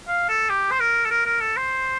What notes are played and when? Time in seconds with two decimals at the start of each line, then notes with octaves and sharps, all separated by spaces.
0.08 F5
0.29 A4
0.50 G4
0.71 C5
0.80 A#4
1.05 A4
1.10 A#4
1.26 A#4
1.41 A4
1.56 C5